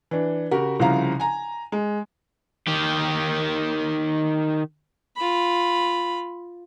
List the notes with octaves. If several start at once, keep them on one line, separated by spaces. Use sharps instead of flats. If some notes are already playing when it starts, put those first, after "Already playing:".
E3 D4
C#3 F#4 G4 A#4
C2 C#3 F3 F5 A#5
G#5 A#5
G#3
D#3 G4
F4 B5